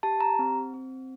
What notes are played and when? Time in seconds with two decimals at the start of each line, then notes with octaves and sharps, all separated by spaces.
0.03 G4 A5
0.21 A#5
0.39 C4
0.74 C4